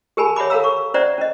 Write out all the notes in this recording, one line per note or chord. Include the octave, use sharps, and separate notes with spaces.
G4 G#4 A#4 G#5 A5 B5
C#5 E5 F#5 B5 D6
A4 A#4 F5 A#5 E6
C#6
C#4 C5 D5 E5 F#5 A#5
C#4 D#5